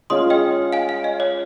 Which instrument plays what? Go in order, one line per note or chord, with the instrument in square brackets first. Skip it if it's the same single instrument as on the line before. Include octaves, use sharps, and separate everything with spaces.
[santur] G#3 C#4 F4 [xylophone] C6 D#6
[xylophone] D#5 G5
F5 G#5
F5
D#5
C#5